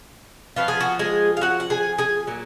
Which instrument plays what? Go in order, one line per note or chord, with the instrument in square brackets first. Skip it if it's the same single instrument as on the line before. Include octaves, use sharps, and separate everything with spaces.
[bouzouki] F3 B3 F4 F#4
G#4
F#4
G#3 G#4
F5
F#4 F#5
F#5
G#4 G#5
G#4 G#5
A#2 F#3